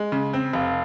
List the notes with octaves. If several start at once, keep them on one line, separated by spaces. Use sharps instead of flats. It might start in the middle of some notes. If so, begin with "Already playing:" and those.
Already playing: G#3
C#3
C4
F1 F5